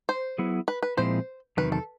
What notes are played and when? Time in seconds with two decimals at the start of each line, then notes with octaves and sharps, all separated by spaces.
0.09 C5
0.38 F#3 B3 E4 G#4
0.68 B4
0.83 B4
0.97 A#2 F3 G#3 C4 E4 C5
1.57 E2 C3 D#3 F#3 B4
1.72 A4